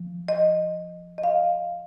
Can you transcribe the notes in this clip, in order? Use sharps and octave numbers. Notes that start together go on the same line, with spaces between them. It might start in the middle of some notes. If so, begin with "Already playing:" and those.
Already playing: F3
D#5
D#5
F5